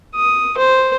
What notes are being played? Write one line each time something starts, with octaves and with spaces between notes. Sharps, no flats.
D#6
C5